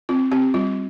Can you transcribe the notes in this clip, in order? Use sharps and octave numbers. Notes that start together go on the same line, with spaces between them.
C4 F4
C4 G4
G3 F4